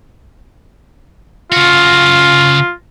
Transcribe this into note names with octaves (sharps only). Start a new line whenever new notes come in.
C#3 F4 F#4